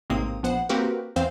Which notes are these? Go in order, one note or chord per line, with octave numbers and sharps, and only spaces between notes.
A1 G#2 C3 A#3 C4 D#6
A#1 B3 C5 F#5
A#3 C4 F#4 G4 A#4 B4
E2 E3 C4 C5 F5 G6